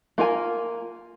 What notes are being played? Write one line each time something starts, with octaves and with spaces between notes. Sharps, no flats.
A#3 F4 A#4 G#5